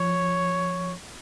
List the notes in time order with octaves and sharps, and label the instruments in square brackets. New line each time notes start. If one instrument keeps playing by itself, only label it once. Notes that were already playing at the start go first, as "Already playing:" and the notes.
Already playing: [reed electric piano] F3 [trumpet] C#5